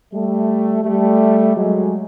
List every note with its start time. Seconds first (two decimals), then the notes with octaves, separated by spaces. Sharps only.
0.13 G3 A3
0.84 G3 A3
1.55 F#3 G#3